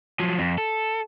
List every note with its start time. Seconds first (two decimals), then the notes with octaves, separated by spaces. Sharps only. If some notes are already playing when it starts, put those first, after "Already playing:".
0.20 F3 F#3
0.39 F2
0.58 A4